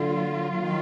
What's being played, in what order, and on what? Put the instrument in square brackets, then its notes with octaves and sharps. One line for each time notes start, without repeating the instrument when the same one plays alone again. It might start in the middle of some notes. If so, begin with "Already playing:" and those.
Already playing: [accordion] D3 [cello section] F#3 A#3 F4
[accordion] D#3